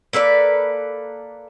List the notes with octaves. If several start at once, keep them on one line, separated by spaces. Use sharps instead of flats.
A#3 A4 B4 D5